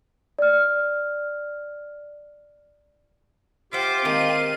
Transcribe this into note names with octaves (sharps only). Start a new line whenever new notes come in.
D5 F6
F4 G4 C5 E5 F#5 D6
D#3 G#3 A#3 C4 D#7